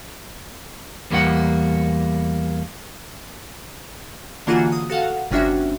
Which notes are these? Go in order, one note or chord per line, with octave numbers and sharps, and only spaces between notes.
E2 G3 A#3 D4 F#5
D3 E3 A#3 F4 F#4 G#4
D#6
F#4 A4 F5 F#5
G1 C3 C#4 D4 F#4 E5